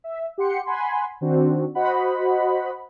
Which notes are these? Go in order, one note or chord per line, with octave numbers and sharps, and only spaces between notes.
E5
G4 F#5 C6 C#7
F#5 G#5 B5 C6
D#3 C4 D4 F#4
F#4 C5 D#5 F#5 B5